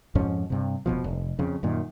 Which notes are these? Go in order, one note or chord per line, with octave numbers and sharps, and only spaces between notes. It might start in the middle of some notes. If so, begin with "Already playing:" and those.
F2 G#2 F3 C#4
G2 C3
F1 B1 B2 F3
F1
F2 C#3
F#2 A#2 D#3